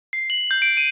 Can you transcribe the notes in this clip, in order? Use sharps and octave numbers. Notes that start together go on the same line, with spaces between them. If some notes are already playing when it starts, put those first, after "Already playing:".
C7
F#7
G6
D7
D#7